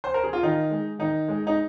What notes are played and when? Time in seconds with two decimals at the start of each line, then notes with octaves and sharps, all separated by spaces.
0.04 C5
0.14 A#4
0.24 G#4
0.33 F4
0.43 D#3 D#4
0.71 G#3
0.99 D#3 D#4
1.28 G#3
1.47 D#4